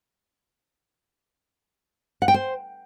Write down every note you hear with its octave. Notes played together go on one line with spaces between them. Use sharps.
F#5
G5
C5